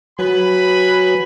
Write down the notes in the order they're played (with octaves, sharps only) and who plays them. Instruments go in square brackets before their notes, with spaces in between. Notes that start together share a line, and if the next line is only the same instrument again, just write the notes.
[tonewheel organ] F#3 [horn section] B4 G#5 B5